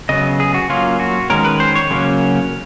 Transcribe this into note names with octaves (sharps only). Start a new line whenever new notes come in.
C#3 F#3 B3 D#5
G#4
F#4
F#3 A#3 C#4 F4
F#4
D#3 G#3 C#4 A#4
B4
C5
C#5
C#3 F#3 A#3 C#4